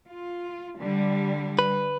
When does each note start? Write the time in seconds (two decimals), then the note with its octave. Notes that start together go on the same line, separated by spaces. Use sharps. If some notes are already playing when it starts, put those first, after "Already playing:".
0.10 F4
0.80 D3 G3
1.59 B4